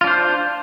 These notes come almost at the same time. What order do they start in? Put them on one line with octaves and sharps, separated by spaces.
F4 D4 C5